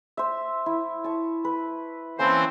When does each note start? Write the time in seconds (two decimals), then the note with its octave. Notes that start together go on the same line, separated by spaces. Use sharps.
0.17 C5 E5
0.66 E4
1.04 A5 C#6
1.44 B4
2.19 E3 A#3 C4 C#4 C5 A5